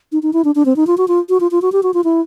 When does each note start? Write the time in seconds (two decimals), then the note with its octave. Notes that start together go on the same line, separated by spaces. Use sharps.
0.12 D#4
0.23 D#4
0.33 E4
0.44 D4
0.55 D4
0.66 C4
0.76 D#4
0.87 F4
0.98 F#4
1.08 F4
1.29 F#4
1.40 F4
1.51 F4
1.62 F#4
1.72 G4
1.83 F#4
1.94 F4
2.04 E4